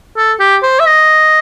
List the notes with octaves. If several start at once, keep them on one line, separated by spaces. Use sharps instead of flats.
A4
G4
C5
E5
D#5